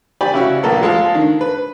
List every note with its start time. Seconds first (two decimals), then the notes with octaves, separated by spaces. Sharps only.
0.21 G4 D5 G#5 B5
0.34 C#3 E4 F#4
0.63 A#1 A#3 A4 B4 A#5
0.82 F3 G#3 A4 F5
1.14 D#3 D4
1.41 B4